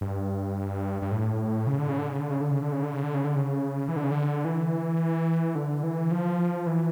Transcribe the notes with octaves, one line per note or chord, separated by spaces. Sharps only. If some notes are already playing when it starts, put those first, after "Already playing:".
G2
G2
A2
C#3
D3
C#3
D3
C#3
D3
C#3
D3
C#3
D3
C#3
D3
C#3
D3
C#3
D3
C#3
E3
D3
C#3
D3
E3
D3
E3
F3
E3